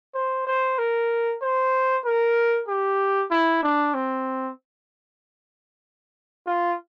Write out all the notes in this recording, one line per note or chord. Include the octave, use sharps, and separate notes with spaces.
C5
C5
A#4
C5
A#4
G4
E4
D4
C4
F4